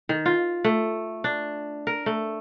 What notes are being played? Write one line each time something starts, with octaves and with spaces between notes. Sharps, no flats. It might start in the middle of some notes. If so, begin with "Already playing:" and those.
D#3
F4
A3
D4
A#4
A3